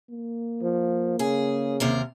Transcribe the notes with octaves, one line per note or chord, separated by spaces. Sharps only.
A#3
F3
C#3 G#4
D#2 C3 A#4